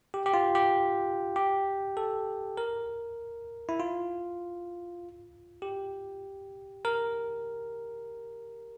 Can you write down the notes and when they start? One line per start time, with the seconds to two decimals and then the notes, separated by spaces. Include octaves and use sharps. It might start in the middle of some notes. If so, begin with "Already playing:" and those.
0.14 G4
0.26 G4
0.34 F4
0.55 G4
1.36 G4
1.97 A4
2.57 A#4
3.69 E4
3.80 F4
5.62 G4
6.85 A#4